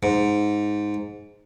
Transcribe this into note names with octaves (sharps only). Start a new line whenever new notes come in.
G#2